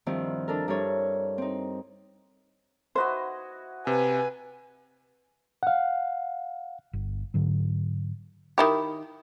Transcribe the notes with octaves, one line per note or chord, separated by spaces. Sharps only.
G2 D#3 F3 C4 E4
D4 A4 A#4
G2 E4 A4 A#4 C#5
C4 D#4
E4 F#4 C5 D#5
C3 B4 G#5
F5 F#5
G1
G#2 D3 F#3
D#3 E4 G4